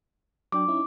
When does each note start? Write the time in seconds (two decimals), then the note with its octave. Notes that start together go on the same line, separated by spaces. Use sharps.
0.52 F#3 D4 G5 D6
0.68 C#4 D#4 E4